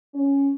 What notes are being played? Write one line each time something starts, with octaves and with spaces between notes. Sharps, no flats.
C#4